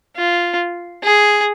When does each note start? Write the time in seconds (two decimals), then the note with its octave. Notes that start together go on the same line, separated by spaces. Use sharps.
0.17 F4
1.03 G#4